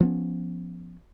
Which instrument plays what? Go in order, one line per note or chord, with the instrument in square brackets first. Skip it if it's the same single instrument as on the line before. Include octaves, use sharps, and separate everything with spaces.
[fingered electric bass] F3 B3 C#4